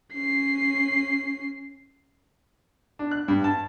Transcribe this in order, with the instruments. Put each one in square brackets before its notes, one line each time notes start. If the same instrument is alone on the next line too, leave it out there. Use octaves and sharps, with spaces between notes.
[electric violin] C#4 C7
[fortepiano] D4
F#6
G2
A5